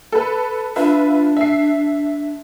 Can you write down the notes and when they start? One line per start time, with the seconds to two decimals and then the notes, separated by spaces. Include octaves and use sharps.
0.12 A4 B4
0.76 D4 F4 B4 E5
1.37 E5 C7